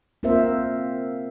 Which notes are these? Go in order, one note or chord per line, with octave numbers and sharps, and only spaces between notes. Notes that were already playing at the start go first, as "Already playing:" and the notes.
A#3 C4 F4 A#4 C5 E5